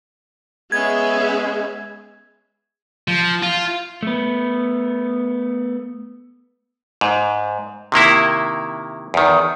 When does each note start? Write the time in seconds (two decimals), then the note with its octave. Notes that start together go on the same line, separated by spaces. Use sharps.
0.72 G#3 B3 C#4 G#4 E5 G#6
3.08 F3
3.43 F4
4.03 A3 B3
7.01 G#2
7.92 C3 D#3 A#3 E4
9.14 E2 D#3